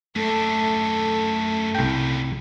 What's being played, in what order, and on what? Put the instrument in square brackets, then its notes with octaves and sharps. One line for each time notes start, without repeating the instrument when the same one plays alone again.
[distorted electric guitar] F#2 D4 [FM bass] A3 [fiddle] A4
[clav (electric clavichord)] C2 G5 [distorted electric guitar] A#2 C#3